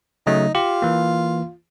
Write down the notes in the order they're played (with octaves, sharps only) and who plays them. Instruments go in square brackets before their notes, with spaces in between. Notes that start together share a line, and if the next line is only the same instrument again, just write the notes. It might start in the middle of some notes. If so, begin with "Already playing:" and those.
[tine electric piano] C#3 F#3 A3 [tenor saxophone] D#4
[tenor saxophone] F4 [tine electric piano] G4
[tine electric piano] E3 A#3